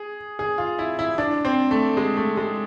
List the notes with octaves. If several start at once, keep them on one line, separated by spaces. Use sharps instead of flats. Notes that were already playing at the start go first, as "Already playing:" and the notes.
Already playing: G#4
G#4
F4
E4
E4
D4
C4
A3
G#3
A3
G#3